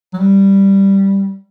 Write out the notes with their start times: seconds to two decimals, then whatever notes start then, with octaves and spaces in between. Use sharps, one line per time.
0.14 F#3
0.19 G3